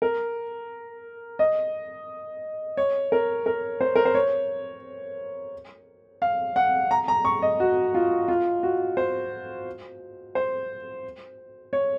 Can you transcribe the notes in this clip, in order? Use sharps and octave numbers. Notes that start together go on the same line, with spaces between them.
A#4
D#5
C#5
A#4
A#4
C5
A#4
C5
C#5
F5
F#5
A#5
A#5
C#6
D#5
F#4
F4
F4
F#4
C5
C5
C#5